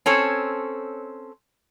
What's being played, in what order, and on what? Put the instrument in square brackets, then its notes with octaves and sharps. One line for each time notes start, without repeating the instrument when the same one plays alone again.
[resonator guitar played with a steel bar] C4 C#4 A4 C#5